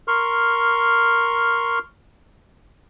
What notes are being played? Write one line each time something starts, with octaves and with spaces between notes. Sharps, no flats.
A#4 C6 C#6 F6